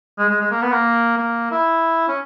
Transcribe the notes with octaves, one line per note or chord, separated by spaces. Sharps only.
G#3
G#3
G#3
A#3
B3
A#3
A#3
E4
C#4